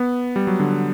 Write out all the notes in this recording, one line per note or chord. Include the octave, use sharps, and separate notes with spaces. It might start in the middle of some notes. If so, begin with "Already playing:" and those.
Already playing: B3
G3
F#3
D3